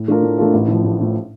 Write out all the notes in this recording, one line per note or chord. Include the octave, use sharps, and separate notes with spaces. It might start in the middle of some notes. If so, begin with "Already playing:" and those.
Already playing: A2
A3 D4 F4 A#4
A2
A3 D4 F4 A#4
A1
A2 F3
A1
A2 F3